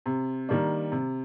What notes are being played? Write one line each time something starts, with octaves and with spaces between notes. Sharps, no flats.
C3
D#3 G3 A#3 D4
C3